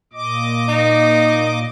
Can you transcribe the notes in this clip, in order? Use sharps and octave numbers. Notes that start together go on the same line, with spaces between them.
A#2 D#5 D6
D#4